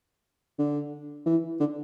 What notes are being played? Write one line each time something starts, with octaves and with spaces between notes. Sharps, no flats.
D3
E3
D3